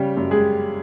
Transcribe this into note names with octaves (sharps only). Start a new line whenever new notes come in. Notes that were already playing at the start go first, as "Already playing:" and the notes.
Already playing: C#3 G3 G4
F#2
G#3 G#4